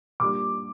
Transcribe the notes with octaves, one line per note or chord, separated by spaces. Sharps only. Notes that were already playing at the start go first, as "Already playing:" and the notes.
A#2 G3 D4 D6